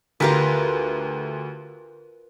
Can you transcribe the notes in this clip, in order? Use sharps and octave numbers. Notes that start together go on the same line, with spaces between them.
D2 F4 G4 A#4 B4